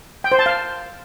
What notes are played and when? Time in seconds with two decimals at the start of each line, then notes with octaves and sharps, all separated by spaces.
0.24 G5
0.32 C5
0.39 A5
0.46 F5